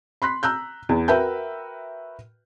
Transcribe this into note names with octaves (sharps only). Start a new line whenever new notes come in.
B5 C6 F#6 B6
A#5 E6 F#6 G6
E2
F#4 A#4 B4 E5 G5 G6